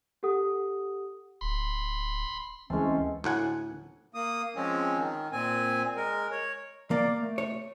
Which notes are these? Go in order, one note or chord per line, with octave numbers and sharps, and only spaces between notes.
G4 A4 F#5 D#6
D1 B5 C6
D2 E3 G#3 A3 C4 C#4
D2 A2 F#5 G#5
A#3 D#6
F3 G#3 C4 C#4
D#3
A#2 C4 G#5
G#3 A#4
C#5
A#3 D5
A3
C#5